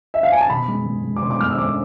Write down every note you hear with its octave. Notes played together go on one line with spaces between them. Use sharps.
E5
F5
G#5
A5
B2 B5
G#3
G#3
G#3
D6
B2 C6
D6
G#3 F6
E6
G#3 D6